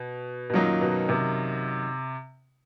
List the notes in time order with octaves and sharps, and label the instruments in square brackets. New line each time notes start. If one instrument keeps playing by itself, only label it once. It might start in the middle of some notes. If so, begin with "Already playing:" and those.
Already playing: [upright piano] B2
B2
[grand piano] F#2 D#3 F#3 A#3 D#4 [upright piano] A#2
[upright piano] B2
C3